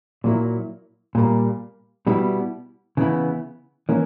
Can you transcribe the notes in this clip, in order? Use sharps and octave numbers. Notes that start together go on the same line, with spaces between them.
A#2 F#3 A#3 E4
A#2 G3 A#3
B2 G3 B3 E4
C#3 E3 B3 E4
E3 A#3 C#4